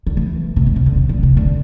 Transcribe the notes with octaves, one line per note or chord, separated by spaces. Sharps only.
D3
E3
C3
A#2
C3
D3
C3
A#2
C3
D3